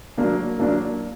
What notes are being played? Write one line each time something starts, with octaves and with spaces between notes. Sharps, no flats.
F#3 A#3 D4
F#3 A#3 D4